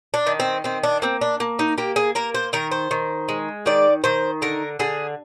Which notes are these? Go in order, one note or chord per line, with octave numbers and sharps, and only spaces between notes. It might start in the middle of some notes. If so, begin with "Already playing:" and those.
D4
D#3
C4
D#3 C4
D4
A#3 C4
D4
A#3
D#4
A#3 G4
G#4
A#3 A#4
C5
D#3 A#4
C5
D#3
G#3
D#3 D5
D#3 C5
D3 A#4
D3 G#4